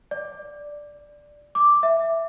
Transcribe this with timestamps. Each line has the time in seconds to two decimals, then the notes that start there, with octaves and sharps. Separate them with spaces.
0.11 D5
1.55 D6
1.83 E5